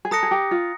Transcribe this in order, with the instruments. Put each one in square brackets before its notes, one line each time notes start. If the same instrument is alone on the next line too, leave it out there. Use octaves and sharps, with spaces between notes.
[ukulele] G#4
[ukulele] A4 [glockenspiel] A#5 D#6 F#6 A#6 C#7
[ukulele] G#4
G4
F4